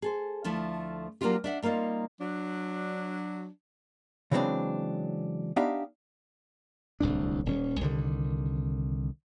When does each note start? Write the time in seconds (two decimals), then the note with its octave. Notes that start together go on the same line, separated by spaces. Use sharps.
0.02 G#4 A4 C5
0.44 D2 F3 A3 E4
1.21 F#3 A#3 C#4 D4 F4 G4
1.44 D4 E5 F#5
1.62 G3 A#3 C4 D#4 F4
2.20 F#3 D4
4.31 C#3 E3 F#3 G#3 C4 D4
5.56 B3 D4 D#4 G4 E5 F5
7.00 D1 C2 A2 D4
7.46 D#1 C#4
7.81 C2 D3 D#3